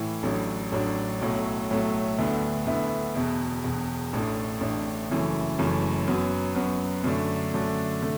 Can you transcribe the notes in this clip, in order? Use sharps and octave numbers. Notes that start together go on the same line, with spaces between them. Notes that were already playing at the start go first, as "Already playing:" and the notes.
Already playing: A2 E3
A1 A2 F#3 D4
A1 A2 F#3 D4
B1 A2 F#3 A3
B1 A2 F#3 A3
D2 D3 B3 E4
D2 D3 B3 E4
E1 E2 B2
E1 E2 B2
A1 A2 A3 D4
A1 A2 A3 D4
F#1 F#2 E3 A3
F#1 F#2 E3 A3
F#2 F#3 B3
F#2 F#3 B3
F#2 D3 A3 D4
F#2 D3 A3 D4
D3 A3